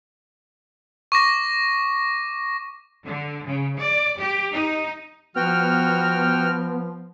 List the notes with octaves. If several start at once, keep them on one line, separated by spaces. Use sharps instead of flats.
C#6 D6 A#6
D3
C#3
D5
G4
D#4
F3 B3 F#4 G5 F6